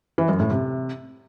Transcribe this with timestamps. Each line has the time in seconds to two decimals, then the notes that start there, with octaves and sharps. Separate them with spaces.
0.18 E3
0.29 F#2
0.40 A2
0.50 C3